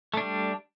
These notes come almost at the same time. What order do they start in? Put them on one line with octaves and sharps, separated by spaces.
A3 D4 G3